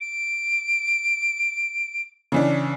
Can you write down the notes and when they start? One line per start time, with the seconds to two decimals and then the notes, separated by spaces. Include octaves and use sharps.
0.01 D7
2.32 C#3 E3 D4